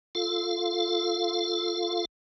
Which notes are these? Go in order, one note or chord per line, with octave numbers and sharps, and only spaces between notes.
F4 A4 F5